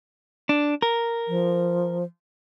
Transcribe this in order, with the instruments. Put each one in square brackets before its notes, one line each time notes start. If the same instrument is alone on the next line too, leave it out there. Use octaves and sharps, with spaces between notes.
[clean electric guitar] D4
A#4
[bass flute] F3